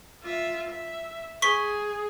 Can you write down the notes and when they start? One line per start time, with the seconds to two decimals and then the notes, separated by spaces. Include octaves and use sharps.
0.23 F4 E5
0.69 E5
1.42 G#4 C#6 B6 G7